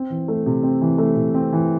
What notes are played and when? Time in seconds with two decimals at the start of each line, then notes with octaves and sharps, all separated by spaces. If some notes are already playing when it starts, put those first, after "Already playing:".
Already playing: C4
0.10 E3
0.28 A3
0.46 C3
0.63 C4
0.81 E3
0.98 A3
1.16 C3
1.34 C4
1.52 E3